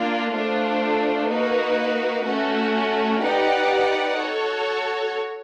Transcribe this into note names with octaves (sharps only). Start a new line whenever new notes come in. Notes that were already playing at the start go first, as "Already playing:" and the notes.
Already playing: A#3 D4 F4
A3 D4 F4 A4 C5
A#3 D#4 F#4 B4
A3 C#4 F#4
D#4 G4 B4 D5 F#5
F#4 A4 C#5